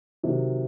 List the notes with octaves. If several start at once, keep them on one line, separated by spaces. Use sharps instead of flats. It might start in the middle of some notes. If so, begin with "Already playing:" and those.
C3 D#3 F#3